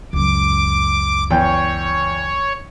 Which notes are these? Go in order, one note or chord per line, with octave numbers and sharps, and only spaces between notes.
C#2 F#2 D6
E2 C#5 G5